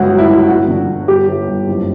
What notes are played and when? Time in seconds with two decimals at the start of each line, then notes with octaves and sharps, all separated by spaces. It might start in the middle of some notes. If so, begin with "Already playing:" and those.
Already playing: G1 C#2 F#4
0.08 F#3
0.18 E4
0.28 F#3
0.48 G1 F#4
0.68 D3
0.88 G1
1.08 G1 G4
1.28 G1
1.48 G1
1.67 F#1